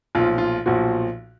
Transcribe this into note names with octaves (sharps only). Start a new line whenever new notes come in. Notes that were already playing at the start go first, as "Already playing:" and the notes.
B1 A#2 F3 F4
F4
B1 A#2 F3 F#4